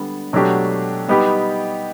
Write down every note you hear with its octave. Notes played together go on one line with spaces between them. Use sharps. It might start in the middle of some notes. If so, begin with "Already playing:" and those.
Already playing: D3 G3 B3
B2 F#3 A3 D4 G4
G3 B3 D#4 G4